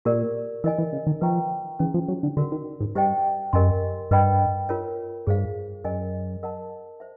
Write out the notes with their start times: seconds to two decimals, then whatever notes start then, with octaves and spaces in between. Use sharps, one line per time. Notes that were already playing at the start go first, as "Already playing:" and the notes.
0.05 A#2 G4 A#4 D5
0.64 E3 A#4 D#5 G#5
0.78 E3
0.93 C#3
1.07 D#3
1.21 F3 B4 E5 G5 A#5 C#6
1.79 E3 C#4 E4 G#4
1.94 F3
2.08 F#3
2.23 D3
2.37 D3 F#4 A#4 D5 F#5
2.52 D#3
2.80 G#2
2.95 G2 G4 C5 D#5 G5
3.53 F#2 G4 A#4 D#5 G#5 C6
4.11 G2 B4 D#5 G5 B5
4.69 F4 A#4 C#5
5.27 G2 G#4 C5 F5
5.84 F#2 A#4 D#5 G#5
6.43 A#4 D#5 F#5 A5
7.00 C5 E5